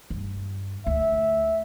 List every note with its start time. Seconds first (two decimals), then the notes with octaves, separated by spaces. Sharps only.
0.10 G2
0.86 D2 E5